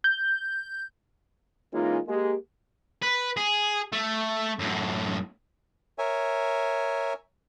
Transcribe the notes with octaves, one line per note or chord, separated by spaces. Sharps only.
G6
E3 G#3 A#3 C#4 D#4 F4
G#3 A#3 G4
B4
G#4
A3
F#2 A2
A#4 C#5 E5 G#5